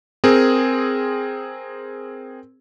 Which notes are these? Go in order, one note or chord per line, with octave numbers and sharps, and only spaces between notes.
C4 G#4 A#4